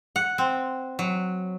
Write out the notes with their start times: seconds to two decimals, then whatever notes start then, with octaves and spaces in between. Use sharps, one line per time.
0.16 F#5
0.38 C4
0.99 F#3